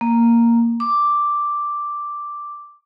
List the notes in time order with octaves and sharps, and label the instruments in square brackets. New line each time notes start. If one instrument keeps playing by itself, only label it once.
[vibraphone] A#3
D6